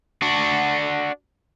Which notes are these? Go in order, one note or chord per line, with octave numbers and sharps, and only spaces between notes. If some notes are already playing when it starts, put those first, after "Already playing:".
D4 F#4